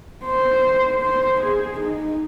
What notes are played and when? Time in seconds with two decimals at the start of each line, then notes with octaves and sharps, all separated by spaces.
0.25 C5
1.02 C5
1.41 G#4
1.79 D#4